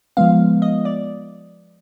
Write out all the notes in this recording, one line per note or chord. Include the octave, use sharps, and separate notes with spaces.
F3 G#3 B3 F5
D#5
D5